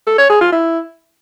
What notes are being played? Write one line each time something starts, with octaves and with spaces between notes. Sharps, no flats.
A4
C#5
G#4
F4
E4